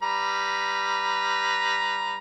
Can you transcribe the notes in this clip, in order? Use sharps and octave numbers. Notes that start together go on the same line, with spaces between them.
G3 B4 A#5